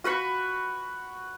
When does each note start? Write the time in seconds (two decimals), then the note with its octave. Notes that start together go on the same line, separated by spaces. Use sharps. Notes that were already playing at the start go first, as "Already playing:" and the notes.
0.04 F#4 B4 B5 C#6